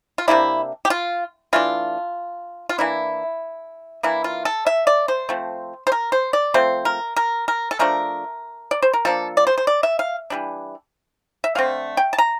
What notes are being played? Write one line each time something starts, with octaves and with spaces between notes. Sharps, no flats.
F4
C3 F3 A#3 D4 E4
G4
F4
E3 A3 D4 F4
F4
E3 A#3 D4 E4
E3 A#3 D4 E4
F4
A4
E5
D5
C5
F3 A3 C4
C5
A#4
C5
D5
F3 A3 C4 C5
A#4
A#4
A#4
A4
F3 A3 D4 A#4
D5
C5
A#4
F3 A#3 D4 A4
D5
C5
C5
D5
E5
F5
E3 G3 D4
E5
D3 A3 C4 F5
G5
A5
A#5